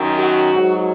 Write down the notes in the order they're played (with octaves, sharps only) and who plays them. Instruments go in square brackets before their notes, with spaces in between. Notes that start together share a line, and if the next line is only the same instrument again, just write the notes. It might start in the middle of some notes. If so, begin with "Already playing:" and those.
Already playing: [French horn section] F#2 D#3 F#3
F#4
G#2 F#3